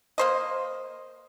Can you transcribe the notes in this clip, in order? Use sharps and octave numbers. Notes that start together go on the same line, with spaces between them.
A#3 C5 D#5